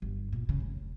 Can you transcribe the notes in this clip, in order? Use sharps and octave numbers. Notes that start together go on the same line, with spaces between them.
G1
A#2
C#3
F1